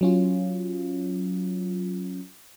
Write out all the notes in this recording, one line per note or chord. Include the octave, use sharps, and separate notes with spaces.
F#3 C#4 F4